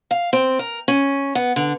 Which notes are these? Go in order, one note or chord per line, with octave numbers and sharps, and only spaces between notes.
F5
C4
A#4
C#4
B3
D3